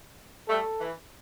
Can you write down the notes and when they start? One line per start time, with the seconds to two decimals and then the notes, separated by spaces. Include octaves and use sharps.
0.48 G3 A3 A4
0.80 E3